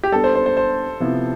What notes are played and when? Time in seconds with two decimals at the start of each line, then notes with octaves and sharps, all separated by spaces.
0.03 G4
0.12 G3 B3 D4 A4
0.24 C5
0.35 C5
0.46 C5
0.57 C5
1.00 C3 F3 B3 E4